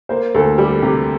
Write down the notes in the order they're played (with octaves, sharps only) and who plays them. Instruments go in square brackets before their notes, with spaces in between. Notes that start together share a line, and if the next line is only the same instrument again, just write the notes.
[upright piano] A#3 [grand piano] C5
[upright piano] D2 [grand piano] A4
[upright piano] G3 [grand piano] G4
[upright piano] C3 [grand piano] G4